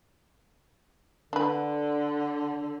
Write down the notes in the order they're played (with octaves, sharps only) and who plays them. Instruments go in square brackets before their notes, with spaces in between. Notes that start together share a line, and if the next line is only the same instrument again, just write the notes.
[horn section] D3 [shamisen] D4 B4